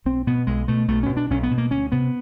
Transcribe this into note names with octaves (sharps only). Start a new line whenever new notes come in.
B1 C4
B2 B3
B1 G#3
B2 A3
B1 A3
C#4
B2
D4
B1 C#4
B3
B2
A#3
D2 C#4
C3 B3